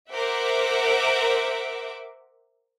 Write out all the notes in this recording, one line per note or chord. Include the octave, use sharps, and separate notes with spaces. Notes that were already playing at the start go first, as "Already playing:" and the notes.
A#4 C5 E5 F#5 D6